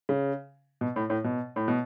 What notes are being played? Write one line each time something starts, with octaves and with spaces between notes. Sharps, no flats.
C#3
B2
A2
A2
B2
A2
B2